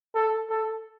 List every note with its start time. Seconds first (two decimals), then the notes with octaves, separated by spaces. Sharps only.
0.15 A4
0.50 A4